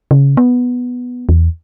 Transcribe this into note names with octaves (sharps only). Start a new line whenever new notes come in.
C#3
B3
E2